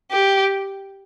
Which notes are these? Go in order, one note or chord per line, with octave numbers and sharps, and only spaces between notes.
G4